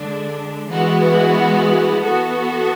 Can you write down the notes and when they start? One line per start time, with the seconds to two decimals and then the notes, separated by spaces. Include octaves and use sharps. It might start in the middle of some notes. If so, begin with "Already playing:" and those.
Already playing: D3 G#3 D4
0.67 E3 G#3 B3 F#4
2.02 E3 B3 F#4 A4